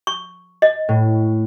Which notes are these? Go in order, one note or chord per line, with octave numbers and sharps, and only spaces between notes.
C#6
D#5
A2